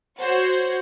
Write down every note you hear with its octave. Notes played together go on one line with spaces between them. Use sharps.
F#4 C5 C#5